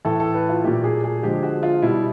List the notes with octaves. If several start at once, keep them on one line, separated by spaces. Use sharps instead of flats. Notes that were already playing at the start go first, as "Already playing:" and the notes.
A2 E3 A3 A4
A4
B4
F4
A#2 F#3 A3 G4
G#4
G#4
D3 F3 G#3 G4
F#4
F4
B2 G3 E4